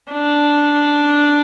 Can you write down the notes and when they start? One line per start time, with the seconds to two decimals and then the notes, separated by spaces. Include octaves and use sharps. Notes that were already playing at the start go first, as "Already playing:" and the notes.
0.12 D4